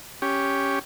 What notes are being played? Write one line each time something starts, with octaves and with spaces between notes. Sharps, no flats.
C#4 G4